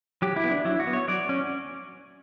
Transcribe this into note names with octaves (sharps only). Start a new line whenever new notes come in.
F#3 G4
E4
B3
D4
F#3 E4
F#4
B3
C#5
F#3 D5
C#4